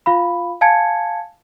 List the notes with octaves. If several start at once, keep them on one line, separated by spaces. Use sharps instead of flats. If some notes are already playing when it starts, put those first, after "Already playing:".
F4 F5 B5
F5 G#5 A5 G#6 C#7